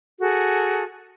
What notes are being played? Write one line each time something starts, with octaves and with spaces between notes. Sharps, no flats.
F#4 G#4 A4